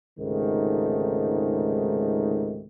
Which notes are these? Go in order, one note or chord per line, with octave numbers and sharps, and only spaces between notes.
C#2 G#2 C3 D#3 A3